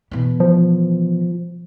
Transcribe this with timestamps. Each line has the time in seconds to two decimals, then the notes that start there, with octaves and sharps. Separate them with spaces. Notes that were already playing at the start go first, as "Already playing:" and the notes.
0.11 B2 E3
0.40 F3